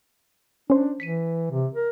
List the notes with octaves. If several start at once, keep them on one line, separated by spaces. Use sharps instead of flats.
C#4 D4 C5
E3 B6 C#7 D#7
C3
A#4